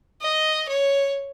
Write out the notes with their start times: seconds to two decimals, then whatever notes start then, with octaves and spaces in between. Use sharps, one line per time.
0.22 D#5
0.69 C#5